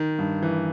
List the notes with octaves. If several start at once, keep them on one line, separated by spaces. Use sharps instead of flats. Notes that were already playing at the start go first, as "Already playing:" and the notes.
Already playing: D#3
G2
E3